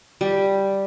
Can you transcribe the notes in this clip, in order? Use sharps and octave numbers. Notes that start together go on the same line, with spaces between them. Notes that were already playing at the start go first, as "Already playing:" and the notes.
G3